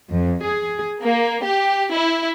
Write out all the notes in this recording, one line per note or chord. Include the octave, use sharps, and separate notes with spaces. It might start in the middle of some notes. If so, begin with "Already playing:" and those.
F2
G#4
A#3
G4
E4